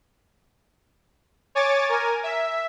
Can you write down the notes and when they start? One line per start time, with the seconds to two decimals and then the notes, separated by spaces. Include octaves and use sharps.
1.55 C#5 G#5 D6 A6
1.89 A#4 G#5
2.24 E5